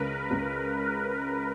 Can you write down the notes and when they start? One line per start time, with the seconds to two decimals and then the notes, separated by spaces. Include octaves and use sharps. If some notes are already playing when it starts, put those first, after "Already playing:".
Already playing: C#2 C#3 A#4 B4
0.31 C#2